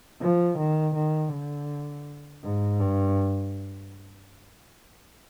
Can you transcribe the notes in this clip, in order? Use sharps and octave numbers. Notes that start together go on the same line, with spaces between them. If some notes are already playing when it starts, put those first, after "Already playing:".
F3
D#3
D#3
D3
G#2
G2